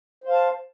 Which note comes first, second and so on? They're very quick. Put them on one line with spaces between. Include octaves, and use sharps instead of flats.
C5 F5 A5